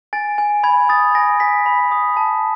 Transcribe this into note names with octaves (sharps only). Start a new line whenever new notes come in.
G#5 A6
G#5
B5 G#6
D#6 A6
G#5 A#6
G#5 B6
B5
D#6
A5